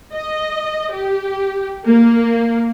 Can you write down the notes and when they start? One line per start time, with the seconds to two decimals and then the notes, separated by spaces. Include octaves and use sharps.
0.13 D#5
0.92 G4
1.86 A#3